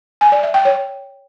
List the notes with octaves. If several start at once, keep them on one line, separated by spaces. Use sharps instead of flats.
G#5
D5
E5
G5
C#5